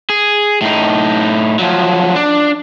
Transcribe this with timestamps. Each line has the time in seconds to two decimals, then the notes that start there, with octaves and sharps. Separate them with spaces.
0.09 G#4
0.62 A2 D#4
1.59 F3 F#3
2.16 D4